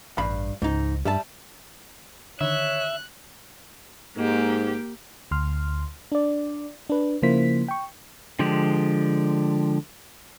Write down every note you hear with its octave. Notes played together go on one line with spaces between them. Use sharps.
A1 G2 F5 B5
C#2 G#2 D#4
G2 G3 E5 A5
D3 D#3 C#5 E5 F#6
G#2 A#3 G4
D2 C6 F6
D4 D5
D4 B4
C#3 F3 A#3 E4 C5 B6
G5 C#6
D3 F3 G#3 G4